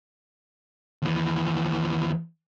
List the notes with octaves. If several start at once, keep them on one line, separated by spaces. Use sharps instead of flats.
D#2 E3